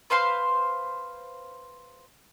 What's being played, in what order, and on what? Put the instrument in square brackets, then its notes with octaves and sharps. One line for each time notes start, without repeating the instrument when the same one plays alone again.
[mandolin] B4 C5 F5 C6